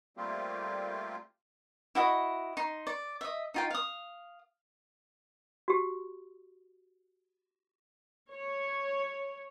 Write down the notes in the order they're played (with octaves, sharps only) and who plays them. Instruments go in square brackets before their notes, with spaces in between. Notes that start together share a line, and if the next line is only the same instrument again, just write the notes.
[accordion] G3 A3 A#3 C4 F4 G4
[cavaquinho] E4 F#4 D#5
D#4 C6
D5
D#5 E5
D#4 F4 G5
F5 D#6
[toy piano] F#4 G4
[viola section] C#5